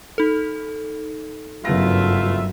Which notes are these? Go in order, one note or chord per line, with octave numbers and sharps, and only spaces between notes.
D#4 A4
F#1 G2 F#3 A3 B3 F4 E5 A#6